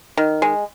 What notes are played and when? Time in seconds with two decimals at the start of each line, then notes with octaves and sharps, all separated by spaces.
0.17 D#3
0.42 G#3